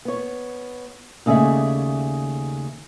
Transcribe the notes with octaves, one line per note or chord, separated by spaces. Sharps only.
B3 C#5
D#2 C#3 A3 G#4 D5 E5